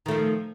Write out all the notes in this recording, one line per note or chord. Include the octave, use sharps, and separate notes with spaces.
D#3 F3 A3